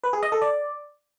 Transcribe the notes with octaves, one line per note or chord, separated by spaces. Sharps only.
B4
G#4
D#5
A4
D5